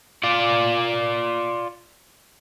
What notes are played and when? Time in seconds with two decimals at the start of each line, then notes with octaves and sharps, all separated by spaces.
0.24 F4 D5